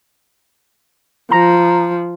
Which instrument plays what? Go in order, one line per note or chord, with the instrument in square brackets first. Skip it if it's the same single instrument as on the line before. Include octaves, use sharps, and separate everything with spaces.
[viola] F3 [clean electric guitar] A#5